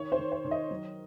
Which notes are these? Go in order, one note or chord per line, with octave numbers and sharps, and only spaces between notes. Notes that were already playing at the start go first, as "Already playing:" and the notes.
Already playing: D#3 C#5
C5
D#3
C5
D#3
D#5
F#3